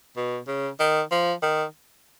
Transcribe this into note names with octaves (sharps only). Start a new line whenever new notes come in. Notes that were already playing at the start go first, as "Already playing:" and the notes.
B2
C#3
D#3
F3
D#3